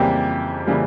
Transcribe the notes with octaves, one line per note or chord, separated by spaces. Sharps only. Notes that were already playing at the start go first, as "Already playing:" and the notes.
Already playing: F2 C#3 E3 G3 A#3 G4
C#3 E3 G3 A#3